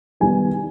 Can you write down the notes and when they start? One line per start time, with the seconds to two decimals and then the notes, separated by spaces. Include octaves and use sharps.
0.20 D#3 G3 B3 G#5